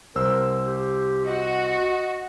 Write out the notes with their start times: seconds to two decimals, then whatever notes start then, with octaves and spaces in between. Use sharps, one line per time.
0.15 C2 A#4 C5 E6
0.66 G4
1.26 F#4 D#5